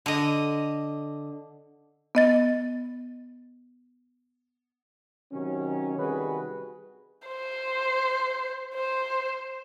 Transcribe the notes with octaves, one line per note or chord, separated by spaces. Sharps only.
D3 D#5
B3 D#5 A6
C3 D#3 F#3 C#4
C3 D#3 G3 F#4 G#4 B4
C5
C5